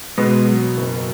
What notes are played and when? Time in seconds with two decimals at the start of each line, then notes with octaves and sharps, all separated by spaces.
0.18 B2 G#3 B3
0.48 F#3
0.77 F#1